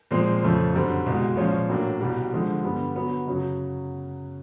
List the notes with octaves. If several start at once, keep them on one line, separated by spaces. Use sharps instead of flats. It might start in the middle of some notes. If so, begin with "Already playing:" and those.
A#2 F3 G#3 C4
F2 C#3 F3 A3
F#2 D3 G3 C4
C2 B2 G#3
A#2 F3 G#3 C#4 F4
A2 F#3 A#3 D4
C2 B2 G3
D3 F3 G#3
G2 D3 G3 B3
D3 F#3 B3
F#2 C#3 F#3